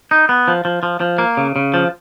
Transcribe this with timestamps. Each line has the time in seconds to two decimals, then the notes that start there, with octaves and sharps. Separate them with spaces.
0.11 D#4
0.29 B3
0.48 F3
0.65 F3
0.83 F3
1.00 F3
1.18 A#3
1.37 C#3
1.56 C#3
1.74 F3